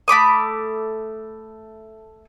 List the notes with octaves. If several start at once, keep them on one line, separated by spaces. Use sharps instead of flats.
A3 B5 D6 D#6